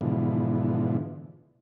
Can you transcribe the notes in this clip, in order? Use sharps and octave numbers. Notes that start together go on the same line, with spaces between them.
G#2 B2 D3 E3 F3